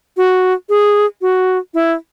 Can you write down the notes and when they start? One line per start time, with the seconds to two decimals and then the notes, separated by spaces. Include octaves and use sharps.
0.17 F#4
0.69 G#4
1.22 F#4
1.74 E4